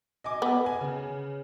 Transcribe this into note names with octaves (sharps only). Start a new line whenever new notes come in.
D#5 G#5 D6
B3
G#5
C#3